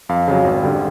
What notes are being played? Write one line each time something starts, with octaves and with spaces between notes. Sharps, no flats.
F2 F5
C#3 F#3
G#1
D3 G3